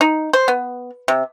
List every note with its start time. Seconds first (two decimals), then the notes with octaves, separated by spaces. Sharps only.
0.01 D#4
0.33 C5
0.48 B3
1.08 C3